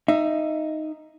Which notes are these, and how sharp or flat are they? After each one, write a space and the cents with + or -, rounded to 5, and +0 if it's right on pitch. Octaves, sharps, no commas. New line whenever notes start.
D#4 +0 E5 +20